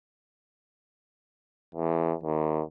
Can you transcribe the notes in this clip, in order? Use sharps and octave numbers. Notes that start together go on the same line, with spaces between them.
E2
D#2